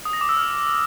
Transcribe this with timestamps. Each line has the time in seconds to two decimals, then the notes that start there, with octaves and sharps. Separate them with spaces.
0.05 D#6
0.13 A#6
0.21 D6
0.29 E6
0.37 F6